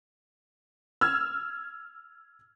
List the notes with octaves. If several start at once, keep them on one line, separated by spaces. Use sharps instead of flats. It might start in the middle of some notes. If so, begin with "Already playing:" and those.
E6 F6 G#6